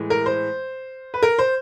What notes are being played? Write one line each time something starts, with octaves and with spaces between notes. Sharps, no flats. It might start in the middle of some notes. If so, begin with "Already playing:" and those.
Already playing: A2 E3 G#3
A#4
C5
B4
A#4
C5